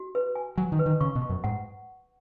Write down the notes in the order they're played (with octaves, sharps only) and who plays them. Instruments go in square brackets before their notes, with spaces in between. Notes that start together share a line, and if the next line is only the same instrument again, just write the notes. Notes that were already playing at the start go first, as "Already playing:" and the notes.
Already playing: [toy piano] F#4
B4
G#5
[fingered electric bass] F#3 [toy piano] G#5
[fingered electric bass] D#3
[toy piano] B4
[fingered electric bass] D#3
[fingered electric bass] C#3 [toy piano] C#6
[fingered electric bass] B2
[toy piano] C#6
[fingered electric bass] F#2
[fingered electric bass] G#2 [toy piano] F#5